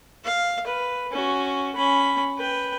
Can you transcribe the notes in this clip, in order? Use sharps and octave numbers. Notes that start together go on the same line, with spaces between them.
F5
B4
C#4 F#4
C#4 B5
B4 G5